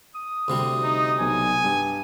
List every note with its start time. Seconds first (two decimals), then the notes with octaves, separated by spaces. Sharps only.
0.15 D#6
0.48 D2 C3 G3
0.83 D#4
1.20 B1 G#5
1.64 G2